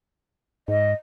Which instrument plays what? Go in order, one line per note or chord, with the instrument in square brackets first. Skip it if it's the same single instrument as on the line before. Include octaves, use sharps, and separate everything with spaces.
[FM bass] G#2 [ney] D#5